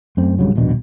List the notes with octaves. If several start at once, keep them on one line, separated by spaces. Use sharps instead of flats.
F#2 A3 C4
C2 G2 C#3 F#3
D#1 A#1 B2 D4